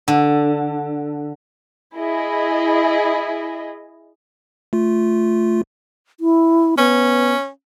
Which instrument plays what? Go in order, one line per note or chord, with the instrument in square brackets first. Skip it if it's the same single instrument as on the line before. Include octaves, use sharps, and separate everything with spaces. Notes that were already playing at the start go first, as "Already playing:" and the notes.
[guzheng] D3
[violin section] E4 G#4 D#5
[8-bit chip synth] A3 F4
[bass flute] E4
[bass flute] B3 [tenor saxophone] C#4